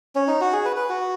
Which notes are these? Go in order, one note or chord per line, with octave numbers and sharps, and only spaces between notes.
C#4
D#4
F#4
G#4
B4
B4
F#4